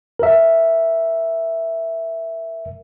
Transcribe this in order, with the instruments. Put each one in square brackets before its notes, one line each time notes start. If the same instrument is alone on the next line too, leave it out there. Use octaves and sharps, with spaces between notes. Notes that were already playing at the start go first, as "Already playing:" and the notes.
[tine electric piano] A#4 E5